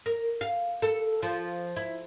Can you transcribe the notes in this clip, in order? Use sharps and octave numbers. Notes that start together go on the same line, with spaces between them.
A#4
F5
A4
F3
E4